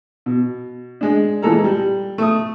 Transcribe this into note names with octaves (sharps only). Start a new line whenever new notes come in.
B2
G#3 D4
A#2 E3 G#3 A4 A#5
G3
A3 D#6